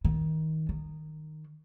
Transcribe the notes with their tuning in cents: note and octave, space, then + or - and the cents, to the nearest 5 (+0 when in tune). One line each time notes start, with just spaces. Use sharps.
D#3 +20
D#3 -10